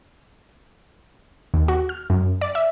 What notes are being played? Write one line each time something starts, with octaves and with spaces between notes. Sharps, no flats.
D#2
F#4
F6
F#2
D5
E5